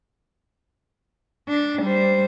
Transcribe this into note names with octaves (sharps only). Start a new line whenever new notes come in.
D4
G3 C5